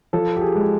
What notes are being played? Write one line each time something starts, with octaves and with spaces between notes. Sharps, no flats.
F3 A4
G4
G#4
G#3